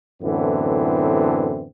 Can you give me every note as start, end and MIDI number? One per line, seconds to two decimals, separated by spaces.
0.22 1.66 42
0.22 1.66 45
0.22 1.66 50
0.22 1.66 52
0.22 1.66 59
0.22 1.66 60